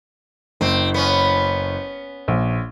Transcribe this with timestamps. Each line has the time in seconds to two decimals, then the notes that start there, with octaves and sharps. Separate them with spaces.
0.61 F#1 C4
0.94 B3 C#4
2.28 A#1